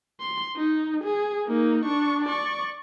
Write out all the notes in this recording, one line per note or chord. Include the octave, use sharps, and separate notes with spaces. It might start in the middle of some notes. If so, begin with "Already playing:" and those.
C6
D#4
G#4
A#3 D#4
D4 C#6
D5 C#6